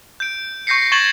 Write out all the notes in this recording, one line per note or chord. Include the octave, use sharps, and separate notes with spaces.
G6 D7
C#6 G6 A#6 C7 C#7
C#6 G#6 A6 E7 F#7 G7